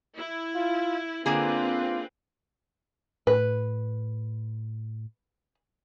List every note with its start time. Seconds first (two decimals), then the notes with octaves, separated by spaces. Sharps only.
0.18 E4
0.56 F4
1.26 D3 A#3 C4 F4 G#4 B4
3.27 A2 B4